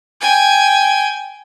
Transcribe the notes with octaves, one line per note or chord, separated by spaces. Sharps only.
G5 G#5